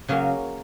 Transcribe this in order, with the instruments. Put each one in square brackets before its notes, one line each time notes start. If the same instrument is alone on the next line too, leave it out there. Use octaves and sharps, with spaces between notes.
[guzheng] C#3 F#3 A#3 C#4